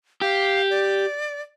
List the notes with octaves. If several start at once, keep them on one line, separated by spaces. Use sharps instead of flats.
G4 F5
D5